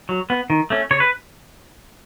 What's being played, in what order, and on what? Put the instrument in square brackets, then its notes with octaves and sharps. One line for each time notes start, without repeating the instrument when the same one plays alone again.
[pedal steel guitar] F#3
B3
D#3
A3 C#4
C#3 C#5
B4